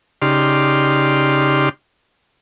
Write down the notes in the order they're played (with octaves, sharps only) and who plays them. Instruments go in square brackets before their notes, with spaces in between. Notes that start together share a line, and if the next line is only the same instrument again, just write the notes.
[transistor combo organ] C#3 D#4 G4 D5 C6 F6